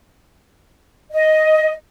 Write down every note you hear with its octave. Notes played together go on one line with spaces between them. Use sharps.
D#5